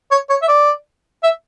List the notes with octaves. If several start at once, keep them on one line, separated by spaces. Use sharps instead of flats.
C#5
C#5
E5
D5
E5